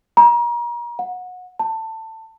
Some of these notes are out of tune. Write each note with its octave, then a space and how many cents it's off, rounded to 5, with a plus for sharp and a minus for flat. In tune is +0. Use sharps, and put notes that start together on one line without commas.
A#5 +35
F#5 -25
A5 +20